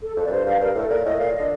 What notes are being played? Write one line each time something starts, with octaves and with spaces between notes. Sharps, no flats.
A4
F2 A4
D5
F2
G2 C5
G2 F5
G2 A#4
A2 A4
A#2 A#4
A2 D#5
A#2 F5
D#5
D3